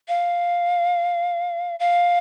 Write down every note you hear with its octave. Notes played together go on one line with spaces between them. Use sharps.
F5
F5